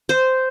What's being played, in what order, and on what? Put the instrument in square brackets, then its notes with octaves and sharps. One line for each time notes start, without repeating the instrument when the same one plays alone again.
[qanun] C5